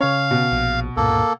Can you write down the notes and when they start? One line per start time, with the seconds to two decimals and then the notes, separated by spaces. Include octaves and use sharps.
0.01 C#3 C#4 C#5 F5
0.31 B2
0.52 A#1
0.97 C#2 G2 A#2 A#3 A4